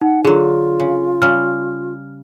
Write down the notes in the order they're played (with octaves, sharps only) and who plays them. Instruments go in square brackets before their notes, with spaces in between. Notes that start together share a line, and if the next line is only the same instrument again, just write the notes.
[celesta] D#4 [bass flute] F#5
[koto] D3 F#3 [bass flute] F4 [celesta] G#4
[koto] C#3
[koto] C#3 G3 [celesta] F6